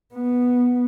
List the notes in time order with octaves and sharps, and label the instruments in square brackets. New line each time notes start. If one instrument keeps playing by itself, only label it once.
[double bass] B3